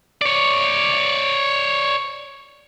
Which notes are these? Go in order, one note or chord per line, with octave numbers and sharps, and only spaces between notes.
C#5 D5